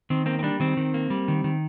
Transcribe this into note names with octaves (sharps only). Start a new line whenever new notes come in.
D#3 C4
A#3 C4
C4
G3 D4
D#3 C4
D#3
A#3
G3
D#3
D#3